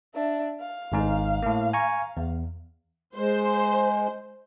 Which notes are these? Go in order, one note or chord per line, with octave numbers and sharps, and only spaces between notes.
D4 E5
F5
G#1 G#2 D#4
A2 A#3
G#5 A#5 C#6
E2
G#3 C5